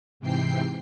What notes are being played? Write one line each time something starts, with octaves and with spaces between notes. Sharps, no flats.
G#2 C3 E3 G5 C7